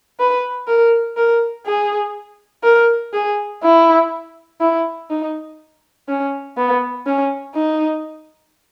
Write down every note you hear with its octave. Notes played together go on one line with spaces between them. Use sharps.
B4
A#4
A#4
G#4
A#4
G#4
E4
E4
D#4
C#4
B3
C#4
D#4